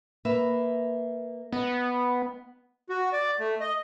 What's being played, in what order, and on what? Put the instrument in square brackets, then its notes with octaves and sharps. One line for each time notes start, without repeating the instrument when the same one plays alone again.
[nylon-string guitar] A#3 B4 E5
[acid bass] B3 [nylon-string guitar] D#5
[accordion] F#4
D5
A3
D#5